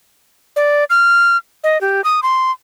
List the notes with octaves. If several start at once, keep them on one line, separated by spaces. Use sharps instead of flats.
D5
F6
D#5
G4
D#6
C6